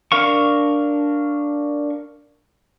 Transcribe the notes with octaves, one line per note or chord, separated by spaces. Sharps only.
D4 A#4 F5 C#6